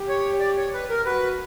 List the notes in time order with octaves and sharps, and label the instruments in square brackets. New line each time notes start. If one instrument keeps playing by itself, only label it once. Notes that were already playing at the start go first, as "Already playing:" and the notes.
Already playing: [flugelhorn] G4
[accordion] C#5
D5
C#5
B4
A#4
[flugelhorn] F#4 [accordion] B4